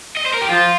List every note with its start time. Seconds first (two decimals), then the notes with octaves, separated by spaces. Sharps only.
0.17 D#5
0.26 C5
0.33 A#4
0.41 G4
0.50 F3 F4